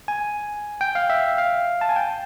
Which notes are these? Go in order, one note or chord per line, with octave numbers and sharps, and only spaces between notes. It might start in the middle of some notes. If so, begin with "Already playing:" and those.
G#5
G5
F5
E5
F5
A5
G#5
G5